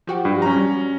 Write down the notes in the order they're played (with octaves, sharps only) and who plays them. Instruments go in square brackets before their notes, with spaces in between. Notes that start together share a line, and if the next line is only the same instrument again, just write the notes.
[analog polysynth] F3 F#4 G4
[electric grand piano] G2
C#4 A#5
[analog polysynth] G3